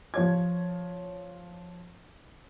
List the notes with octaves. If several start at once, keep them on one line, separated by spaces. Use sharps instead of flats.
F3 C#5 G#6